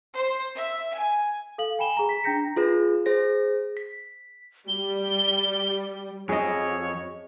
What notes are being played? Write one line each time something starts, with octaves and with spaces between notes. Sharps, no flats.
C5
E5
G#5
A4 F5 F#7
G5 G#5 B5 E7 G7
G#4 A#5
B6
D4 G5 A#5 G6 A#6 C#7
F4 G#4 B4
G#4 C5 A#6
B6
G3 G7
F2 G#4 C#5 D#5